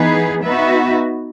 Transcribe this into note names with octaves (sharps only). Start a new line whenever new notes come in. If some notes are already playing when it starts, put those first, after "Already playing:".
Already playing: E3 B3 D#4 G#4 B4
B3 D#4 F#4 B4 E5